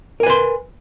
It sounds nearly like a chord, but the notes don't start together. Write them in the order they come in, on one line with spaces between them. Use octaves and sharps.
A#4 G#5 B4 C6